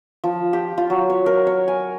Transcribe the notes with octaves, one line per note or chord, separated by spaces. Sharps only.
F3
G4
F4
F#3
C#5
A#4
C#5
G#5